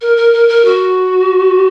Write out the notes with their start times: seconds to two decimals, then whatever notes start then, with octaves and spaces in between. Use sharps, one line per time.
0.01 A#4
0.17 A#4
0.33 A#4
0.48 A#4
0.64 F#4